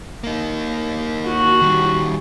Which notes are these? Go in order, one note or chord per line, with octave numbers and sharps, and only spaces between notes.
A#3 D#4
F#4
D#3 G3